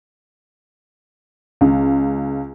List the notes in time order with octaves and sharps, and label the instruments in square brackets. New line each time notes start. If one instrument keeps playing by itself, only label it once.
[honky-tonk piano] C#2